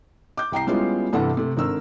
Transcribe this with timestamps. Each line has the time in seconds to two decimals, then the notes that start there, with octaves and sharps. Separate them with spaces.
0.37 D6 G6
0.52 C2 G5 A#5 C7
0.67 G3 G#3 B3 C#4 E4 F4
1.13 G2 C3 E3 A4 F#5
1.37 C3 A3
1.57 G#1 D3 A#4 E6